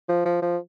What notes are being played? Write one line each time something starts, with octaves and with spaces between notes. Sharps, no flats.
F3
F3
F3